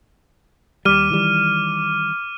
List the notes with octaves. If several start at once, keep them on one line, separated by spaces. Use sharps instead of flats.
D#2 G3 D6 F6 D#7
D#3 E3 G3